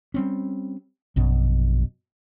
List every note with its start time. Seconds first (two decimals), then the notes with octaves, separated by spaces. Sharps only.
0.14 G3 C4 C#4
1.16 A#1 F#2 B2